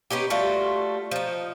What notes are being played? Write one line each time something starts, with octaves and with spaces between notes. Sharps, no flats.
B3 C#4 D#4 G4
G3 A3 F4 F#4
F3 D#4